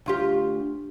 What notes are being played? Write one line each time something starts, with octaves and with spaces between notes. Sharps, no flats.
D2 F4 G4